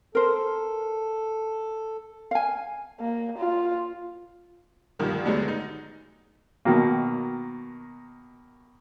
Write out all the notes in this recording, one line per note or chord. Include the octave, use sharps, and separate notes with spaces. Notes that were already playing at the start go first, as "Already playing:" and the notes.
A4 A#4 C5
F5 G#5
A#3
F4
D2 G2 B2 D#3 F3 A#3
D2 D3 F#3 G#3 B3 D4
D#4
B2 D#3 F#3 A#3